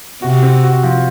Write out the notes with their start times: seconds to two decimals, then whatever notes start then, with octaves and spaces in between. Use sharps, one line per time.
0.22 C3 F#4
0.43 C4
0.63 F#4
0.83 F3